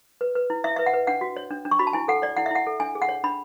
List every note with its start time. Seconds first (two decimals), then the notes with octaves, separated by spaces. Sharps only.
0.21 B4
0.35 B4
0.50 E4
0.64 E4 E5
0.76 B4 E5
0.86 F#5
0.94 B4
1.07 D4 F#5
1.21 F#4
1.36 C#5
1.51 D4
1.65 D4
1.71 C#6
1.79 F#4 B5
1.87 A5
1.93 E4 G#5
2.08 A4 F#5
2.22 C#5 D5
2.37 E4 F#5
2.46 E5
2.51 E4 F#5
2.67 A4
2.80 D4 G#5
2.95 G#4
3.02 F#5
3.09 C#5
3.24 D4 B5